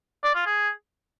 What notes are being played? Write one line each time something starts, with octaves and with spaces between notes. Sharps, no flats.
D5
F4
G#4